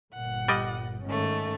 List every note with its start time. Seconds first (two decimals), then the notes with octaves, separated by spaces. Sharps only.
0.14 G1 A#2 F#5
0.48 G3 D5 D#5
1.07 G#2 D#3 A3 C#4